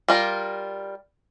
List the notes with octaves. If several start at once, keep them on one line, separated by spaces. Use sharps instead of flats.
G3 F4 A#4